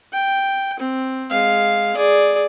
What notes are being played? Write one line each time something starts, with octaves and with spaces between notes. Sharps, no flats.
G5
C4
G#3 F5
G#4 D5